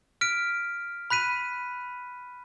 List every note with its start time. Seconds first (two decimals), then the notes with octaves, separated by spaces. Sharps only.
0.21 F6 B6 D7
1.10 B5 F#6 B6 D#7